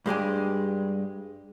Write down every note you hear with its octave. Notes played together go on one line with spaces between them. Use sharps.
G2 G#3 G4 G#5